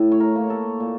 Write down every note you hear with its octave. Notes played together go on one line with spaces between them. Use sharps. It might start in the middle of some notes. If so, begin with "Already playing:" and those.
Already playing: A2
C#5
A#4
A#3
A4
A#2